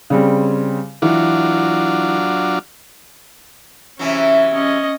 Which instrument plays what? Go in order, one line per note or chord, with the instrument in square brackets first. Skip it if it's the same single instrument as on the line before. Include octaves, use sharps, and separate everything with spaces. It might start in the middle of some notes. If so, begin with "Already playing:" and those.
[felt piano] C#3 G3 C4
[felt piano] E3 [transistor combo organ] F#3 D4 F4
[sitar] C3 E3 F#3 [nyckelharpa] C#4 E5
[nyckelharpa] C#4 D#5